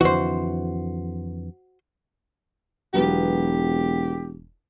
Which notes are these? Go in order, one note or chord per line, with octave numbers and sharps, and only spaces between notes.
F2 D3 E3 F#4 C5
E1 F#3 B3 F4 G4